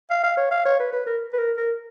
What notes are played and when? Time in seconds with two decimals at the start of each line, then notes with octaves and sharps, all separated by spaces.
0.10 F5
0.23 F5
0.37 C#5
0.51 F5
0.65 C#5
0.79 B4
0.93 B4
1.07 A#4
1.33 B4
1.38 A#4
1.57 A#4